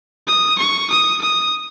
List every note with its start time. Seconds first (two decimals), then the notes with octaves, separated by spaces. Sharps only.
0.27 D#6
0.58 C#6
0.90 D#6
1.21 D#6